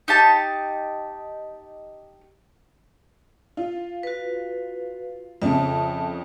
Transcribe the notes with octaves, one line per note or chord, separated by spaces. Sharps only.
D#4 G4 A5
F4
F#4 B4
F2 C#3 E5 A5